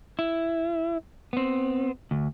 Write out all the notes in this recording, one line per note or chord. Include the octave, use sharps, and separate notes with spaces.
E4
B3 C4
D2